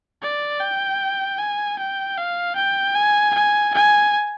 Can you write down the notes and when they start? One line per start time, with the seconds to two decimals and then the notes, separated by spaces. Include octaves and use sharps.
0.22 D5
0.60 G5
1.38 G#5
1.79 G5
2.18 F5
2.56 G5
2.95 G#5
3.34 G#5
3.74 G#5